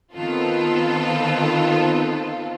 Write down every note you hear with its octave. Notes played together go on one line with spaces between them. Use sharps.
D#3 B3 C4 F4 A4